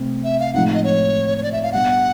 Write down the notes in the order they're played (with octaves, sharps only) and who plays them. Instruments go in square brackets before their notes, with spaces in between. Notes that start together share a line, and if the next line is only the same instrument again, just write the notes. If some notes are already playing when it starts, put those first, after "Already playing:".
Already playing: [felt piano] C3 A3 C4
[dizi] E5
F5
[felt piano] A2 F3 G#3 C4 D#4 [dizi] F#5
[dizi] D#5
C#5
C#5
D5
E5
F5
[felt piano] B2 G3 B3 D4 [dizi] F#5